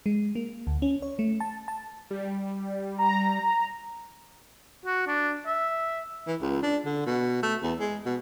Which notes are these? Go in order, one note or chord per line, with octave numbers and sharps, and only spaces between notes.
G#3
A#3
D2
C#4
C#5
A3
A5
A5
G3
A#5
F#4
D4
E5
E3
C#2
D4
D3
B2
A3
E2
G#3
B2